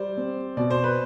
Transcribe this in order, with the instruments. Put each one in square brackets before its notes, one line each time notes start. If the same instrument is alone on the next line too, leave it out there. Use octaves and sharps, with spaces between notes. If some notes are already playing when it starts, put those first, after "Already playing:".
Already playing: [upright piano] G3 [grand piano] C5 D5
[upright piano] C4
[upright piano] B2 [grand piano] D5
[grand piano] C5
B4